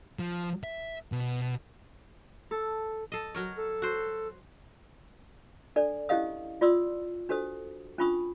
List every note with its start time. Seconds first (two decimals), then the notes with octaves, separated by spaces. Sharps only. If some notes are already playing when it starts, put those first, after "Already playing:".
0.19 F3
0.63 E5
1.12 B2
2.51 A4
3.12 A4 D#5
3.35 F#3 A#4 C#5
3.57 A4
3.82 F#4 C5
5.76 D4 A4 D5
6.09 C#4 E4 G4 D#5 F5 D#6
6.61 F4 D5 C6 D#6 E6
7.29 D4 F#4 A4 C5 D#6
7.98 C#4 D4 F4 B5 C#6 D#6